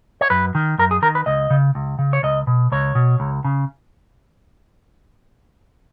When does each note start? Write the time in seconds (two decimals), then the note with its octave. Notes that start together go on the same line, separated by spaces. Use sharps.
0.21 C#5
0.30 F#2 B4
0.55 D#3
0.78 F#2 A#4
0.91 G#4
1.02 D#3 A#4
1.15 B4
1.26 C#2 D#5
1.50 C#3
1.75 C#2
1.99 C#3
2.13 C#5
2.23 C#2 D#5
2.47 B2
2.72 C#2 C#5
2.95 B2
3.20 C#2
3.44 C#3